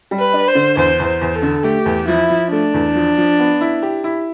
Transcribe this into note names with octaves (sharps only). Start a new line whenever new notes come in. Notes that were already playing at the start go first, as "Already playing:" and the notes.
G3
B4
D4
C5
D3
E2 C5
E2
C5
E2
A4
D3
A3 G4
E2
F3 E4
F3
A3 D4
E2
F3
F3
B3
E4
G4
E4